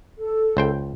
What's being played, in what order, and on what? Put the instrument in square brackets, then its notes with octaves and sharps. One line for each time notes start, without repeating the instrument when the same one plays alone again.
[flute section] A4
[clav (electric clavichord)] C#2 C5 G5